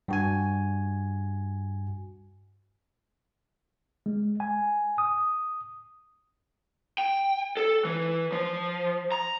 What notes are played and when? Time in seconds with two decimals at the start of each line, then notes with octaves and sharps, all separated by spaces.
0.08 G2 F#4 G#5
4.06 G#3
4.40 G#5
4.98 D#6
6.98 G5
7.57 A4
7.85 E3
8.32 F3
9.12 A#5